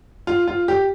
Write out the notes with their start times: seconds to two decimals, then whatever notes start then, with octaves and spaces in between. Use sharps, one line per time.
0.27 F4
0.48 F4
0.68 G4